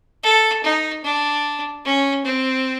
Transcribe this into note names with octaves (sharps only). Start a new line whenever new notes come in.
A4
D#4
D4
C#4
C4